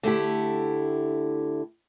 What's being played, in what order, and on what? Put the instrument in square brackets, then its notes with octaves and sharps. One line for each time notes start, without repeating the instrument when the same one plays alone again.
[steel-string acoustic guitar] D3 A3 E4 G4